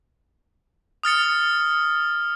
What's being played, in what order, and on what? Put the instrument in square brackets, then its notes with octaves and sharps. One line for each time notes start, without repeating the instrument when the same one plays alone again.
[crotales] D#6 F6 A6 C#7